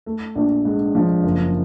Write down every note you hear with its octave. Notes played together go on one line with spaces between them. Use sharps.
A3
A#1
G#2
F3
F#1